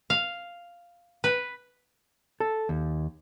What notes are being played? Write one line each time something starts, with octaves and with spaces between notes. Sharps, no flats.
F5
B4
A4
D#2